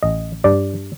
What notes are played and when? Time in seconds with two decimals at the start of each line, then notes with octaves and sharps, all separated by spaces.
0.03 A1 D#5
0.44 G2 D5